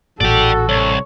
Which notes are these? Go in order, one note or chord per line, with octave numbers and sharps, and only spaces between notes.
A1 A#2 F#4 A4 D5 G5
C2 C#5